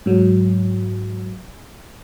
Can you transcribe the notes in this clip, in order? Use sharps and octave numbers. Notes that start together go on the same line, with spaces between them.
G#2 F#3